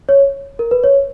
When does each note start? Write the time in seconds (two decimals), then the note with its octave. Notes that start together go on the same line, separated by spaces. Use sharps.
0.09 C#5
0.59 A#4
0.71 B4
0.84 C#5